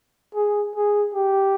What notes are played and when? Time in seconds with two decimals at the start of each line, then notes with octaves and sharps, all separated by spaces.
0.35 G#4
0.76 G#4
1.15 G4